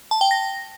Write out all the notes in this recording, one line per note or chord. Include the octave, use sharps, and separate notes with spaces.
A5
G5
A#6